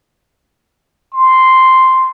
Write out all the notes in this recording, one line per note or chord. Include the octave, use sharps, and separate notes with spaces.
C6